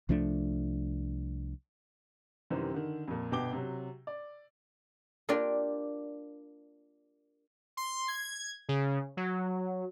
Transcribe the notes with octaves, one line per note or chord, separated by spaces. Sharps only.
C2 F3 A3 D4
F#2 C3 D#3 E3 G3 C4
D3 D#3
F2 A#2
G1 B2 G5 D6 G7
C3 F#3
D5
A#3 D4 F4 G4 D5
C6
G#6
C#3
F#3